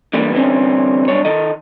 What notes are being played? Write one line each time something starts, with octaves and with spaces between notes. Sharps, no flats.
D3 E3 G3 A#3 B3
D3 E3 G3 G#3 C4 C#4
B1 G2 D4 C#5
D#3 A4 D#5